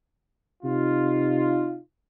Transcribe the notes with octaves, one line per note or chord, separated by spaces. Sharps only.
C3 D#4 F4